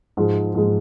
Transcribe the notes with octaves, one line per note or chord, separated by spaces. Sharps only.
G#2 F3 G#3
G#2 F3 G#3